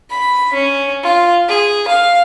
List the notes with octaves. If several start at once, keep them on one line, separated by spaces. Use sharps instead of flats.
B5
C#4
F4
G#4
F5